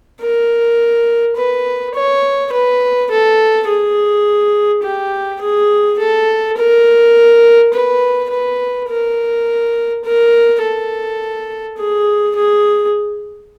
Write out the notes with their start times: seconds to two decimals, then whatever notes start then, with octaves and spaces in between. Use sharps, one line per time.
0.21 A#4
1.37 B4
1.95 C#5
2.53 B4
3.10 A4
3.67 G#4
4.83 G4
5.41 G#4
5.99 A4
6.57 A#4
7.73 B4
8.30 B4
8.88 A#4
10.04 A#4
10.62 A4
11.78 G#4
12.36 G#4